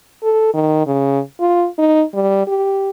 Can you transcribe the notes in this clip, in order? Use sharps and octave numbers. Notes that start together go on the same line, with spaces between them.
A4
D#3
C#3
F4
D#4
G3
G4